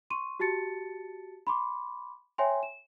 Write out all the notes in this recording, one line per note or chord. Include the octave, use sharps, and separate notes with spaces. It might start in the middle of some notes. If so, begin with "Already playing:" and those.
C6 C#6 D#7
F#4 G4 A5 A6 C#7
B5 C6 D6
C#5 E5 G5 G#5 C6
E7